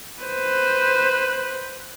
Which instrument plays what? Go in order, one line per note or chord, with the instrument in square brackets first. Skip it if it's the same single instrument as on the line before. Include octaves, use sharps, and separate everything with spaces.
[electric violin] B4 C5